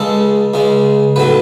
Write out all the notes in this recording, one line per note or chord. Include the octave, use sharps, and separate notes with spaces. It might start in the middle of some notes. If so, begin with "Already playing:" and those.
Already playing: C#2 C#3 G#3 A4
C#2 C#3 G#3
B1 A2 F#3 B4